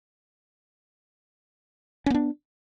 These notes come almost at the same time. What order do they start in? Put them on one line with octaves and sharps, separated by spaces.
C#4 B3 D4